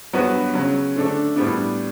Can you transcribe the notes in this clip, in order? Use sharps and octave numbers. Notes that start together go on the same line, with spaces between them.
G2 F#3 B3 F#4 B4
C#3 F#3 C#4
D3 A3 D4 A4
A2 G3 B3 D4